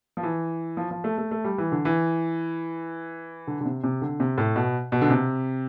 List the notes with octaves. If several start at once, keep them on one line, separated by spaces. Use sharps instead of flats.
F3
E3
F3
F3
A3
A3
A3
G3
E3
D3
E3
D3
D3
C3
C3
D3
C3
A2
B2
B2
D3
C3